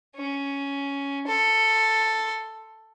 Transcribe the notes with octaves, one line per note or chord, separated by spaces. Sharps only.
C#4
A4 C6